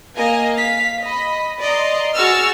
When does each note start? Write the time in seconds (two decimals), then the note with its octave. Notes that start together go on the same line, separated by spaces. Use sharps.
0.16 A#3 D#5 G#5
0.56 F5 B6
1.02 D#5 B5
1.63 D5 D#5 A#5 C6
2.16 F#4 G#4 C#6 E6 F6 A6